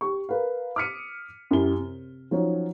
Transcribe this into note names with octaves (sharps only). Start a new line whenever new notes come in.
G4 C#6
A#4 B4 F5
D6 D#6 F6 B6 C#7 D#7
F#2 E4 G4 G7
C3
F3 F#3 C#4 D#4 F4 F#4